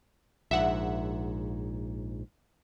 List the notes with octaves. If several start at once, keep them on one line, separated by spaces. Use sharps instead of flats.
A#1 G#2 E5 F#5